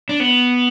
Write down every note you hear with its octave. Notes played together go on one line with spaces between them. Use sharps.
D4
B3